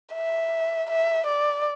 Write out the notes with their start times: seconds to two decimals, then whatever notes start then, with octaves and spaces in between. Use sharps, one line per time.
0.15 E5
0.90 E5
1.26 D5